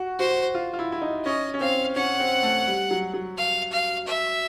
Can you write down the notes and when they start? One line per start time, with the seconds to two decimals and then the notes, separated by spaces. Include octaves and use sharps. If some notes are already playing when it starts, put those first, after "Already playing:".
Already playing: F#4
0.19 F#4 C5
0.55 F4
0.73 F4
0.79 E4
0.92 E4
1.02 D#4
1.25 C#4 D#5
1.54 C#4
1.61 C4 F5
1.96 C#4 F#5
2.20 C4
2.43 A3
2.67 G3
2.91 F#3
3.14 F#3
3.37 F5
3.72 F5
4.07 E5